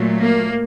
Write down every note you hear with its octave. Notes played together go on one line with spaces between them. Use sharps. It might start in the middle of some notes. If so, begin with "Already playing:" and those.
Already playing: A#2 F#3 A3
A#3